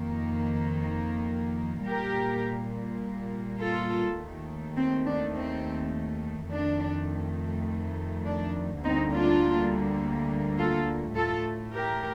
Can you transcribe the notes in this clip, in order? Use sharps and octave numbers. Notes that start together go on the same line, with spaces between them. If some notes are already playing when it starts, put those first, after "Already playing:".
Already playing: F2 D#3 A#3
A#2 G3 A#3 G4 A#4
F4 A4
D#2 D#3 A3
C4
D4
C4
F2 D#3 A3 D4
D4
D2 D3 G3 A#3 C4 D#4
D4 F4
F4 A4
A2 A3 F4 A4
G4 A#4